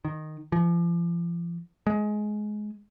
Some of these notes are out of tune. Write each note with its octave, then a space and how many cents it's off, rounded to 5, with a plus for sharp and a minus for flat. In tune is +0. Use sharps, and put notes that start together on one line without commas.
D#3 -10
F3 -35
G#3 +20